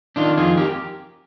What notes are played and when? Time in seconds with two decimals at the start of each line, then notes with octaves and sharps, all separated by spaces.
0.16 D#3 D4 F4
0.37 F2 F4 G#4
0.57 G4 A#4